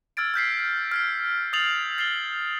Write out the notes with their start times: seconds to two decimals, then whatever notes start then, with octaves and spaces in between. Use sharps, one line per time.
0.17 E6 F6 G#6 A6 D7
0.34 F6 G6 B6 C7
0.92 F6 G#6 C7
1.53 D#6 G6 A6 C7 F7 F#7
1.98 A6 C7 F7 G7